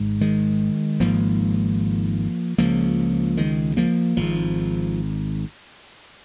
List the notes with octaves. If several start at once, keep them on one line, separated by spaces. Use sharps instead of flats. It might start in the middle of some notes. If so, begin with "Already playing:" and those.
Already playing: G#1 G#2
D#3 G#3
G#1 G#2 F3 A#3
C#2 C#3 F3 A#3
D#3 G#3
F3 A#3
G#1 G#2 F3